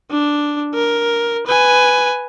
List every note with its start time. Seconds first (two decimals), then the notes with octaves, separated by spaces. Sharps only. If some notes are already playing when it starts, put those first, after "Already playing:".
0.11 D4
0.75 A#4
1.47 B4 G#5